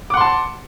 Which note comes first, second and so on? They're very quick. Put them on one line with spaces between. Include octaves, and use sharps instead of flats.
D6 F#5 C6 A5